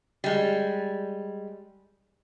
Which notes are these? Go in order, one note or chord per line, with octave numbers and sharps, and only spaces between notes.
G3 G#3